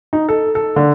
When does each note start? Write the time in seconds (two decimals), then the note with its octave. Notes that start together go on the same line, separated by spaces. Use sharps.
0.13 D#4
0.29 A4
0.55 A4
0.76 D3